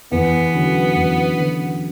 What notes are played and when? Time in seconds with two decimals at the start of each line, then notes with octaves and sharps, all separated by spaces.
0.12 E2 B3
0.54 D3 F#3 C#4
0.95 E2
1.36 D3 F#3 C#4